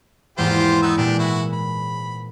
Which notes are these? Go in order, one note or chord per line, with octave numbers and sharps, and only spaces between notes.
E2 G#2 A#3 F4 G4 C5
B3 D#4 E6
A#2 G#3 D4 G4
E4 F#4
B5